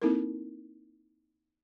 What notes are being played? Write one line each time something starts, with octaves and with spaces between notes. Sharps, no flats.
A#3 C4 D#4 E4 A4 A#4